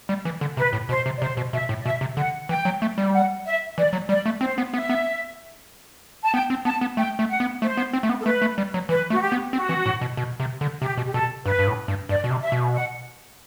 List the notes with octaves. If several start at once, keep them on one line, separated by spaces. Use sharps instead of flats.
G3
E3
D3
C3 B4
A2
B2 C5
C3
D5
C3 C5
B2
B2 E5
A2
D5
B2 E5
C3
D3 F#5
E3 G5
F#3
A3
G3
F#5
E5
E3 D5
F#3
G3 D5
A3
C4 C5
B3
B3 E5
B3
A5
B3 G5
C4
B3 A5
B3
A3 G5
A3
F#5
B3
A3 C5
B3
C4
A3
B3
A4
A3 B4
A3
G3
F#3
E3 B4
A3 F#4
G4
B3
C4 F#4
E3
A2
B2
B2
C3
D3
C3 G4
B2
G4
B2 A4
G2 B4
G2
A2
G2
G2 D5
B2
C3
E5
B2
F#5